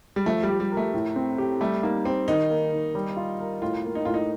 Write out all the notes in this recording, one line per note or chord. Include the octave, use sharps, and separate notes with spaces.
G3
F3 A3
G3
G4
G3
A#4
A3
A2
C4
G4
G3 A3
A#3 D#4
C4 G4
D#3 D#4
A#3
D#3
G3
F4
A#4
A2 F4
A#3
D#4
A2 F4
D#4